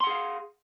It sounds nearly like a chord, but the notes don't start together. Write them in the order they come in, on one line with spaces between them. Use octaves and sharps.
C6 F#5 G#4 F5